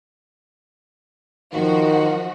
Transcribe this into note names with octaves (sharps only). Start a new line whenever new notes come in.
D#3 F3 F#4